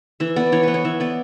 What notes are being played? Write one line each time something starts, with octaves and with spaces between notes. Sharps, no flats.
E3 E5
B3 D5
E3 C#5
B3 B4
C#5
E3 E5
B3 D5